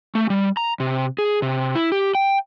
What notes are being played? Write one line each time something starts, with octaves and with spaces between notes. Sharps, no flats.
A3
G3
A#5
C3
G#4
C3
E4
G4
G5